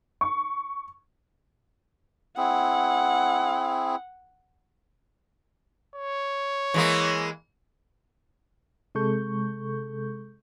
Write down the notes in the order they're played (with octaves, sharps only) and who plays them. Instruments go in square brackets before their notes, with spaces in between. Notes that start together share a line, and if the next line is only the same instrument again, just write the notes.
[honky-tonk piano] C#6
[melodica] C4 E4 G#4 [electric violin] F#5
[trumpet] C#5
[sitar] E3 G#3 A#3
[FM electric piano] C3 G#3 A4 C#6 G6